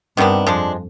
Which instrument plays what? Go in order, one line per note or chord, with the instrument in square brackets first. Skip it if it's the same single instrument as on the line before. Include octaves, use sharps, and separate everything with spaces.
[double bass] G2 [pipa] C3 D#3 B3 D4
[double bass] F2 [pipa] F3 G#3 D4